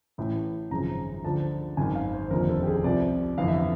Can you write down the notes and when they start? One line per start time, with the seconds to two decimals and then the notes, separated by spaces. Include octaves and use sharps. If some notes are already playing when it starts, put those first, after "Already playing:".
0.18 A1 A2 E3
0.71 G#1 F#2 C#3 F3 A#5
1.24 D2 D3 F3 A5
1.77 G#1 F#2 D#3 G#5
1.95 F5
2.13 C5
2.31 F1 D#2 D3 F3 A#4
2.50 A4
2.63 G4
2.67 G#4
2.84 C2 C3 F3 D5
3.38 G1 F2 C3 E3 F5
3.48 E5
3.58 F5